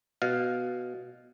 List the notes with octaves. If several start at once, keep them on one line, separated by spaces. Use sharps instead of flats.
B2 F5